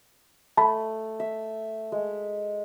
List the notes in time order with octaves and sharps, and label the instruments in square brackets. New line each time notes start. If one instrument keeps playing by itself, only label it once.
[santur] A3 [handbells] A5 B5
[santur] E5
G#3